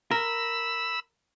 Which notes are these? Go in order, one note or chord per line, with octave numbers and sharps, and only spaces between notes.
A#4 B5 E6